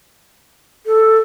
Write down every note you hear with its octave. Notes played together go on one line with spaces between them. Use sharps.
A4